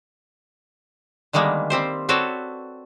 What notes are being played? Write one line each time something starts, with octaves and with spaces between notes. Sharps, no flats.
D3 D#3 G3 G#3 A#3 B3
G3 C4 G4 C5
C4 F#4 A4 B4 C#5 D5